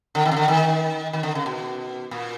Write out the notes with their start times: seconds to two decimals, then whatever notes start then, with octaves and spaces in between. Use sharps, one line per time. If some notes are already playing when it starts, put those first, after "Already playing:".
0.15 D3
0.25 D#3
0.31 C#3
0.36 D3
0.48 D#3
1.13 D#3
1.23 D3
1.35 C#3
1.46 B2
2.11 A#2